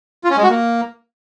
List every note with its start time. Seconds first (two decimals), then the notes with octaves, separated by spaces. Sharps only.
0.24 F4
0.30 C#4
0.37 G#3
0.43 F#4
0.49 A#3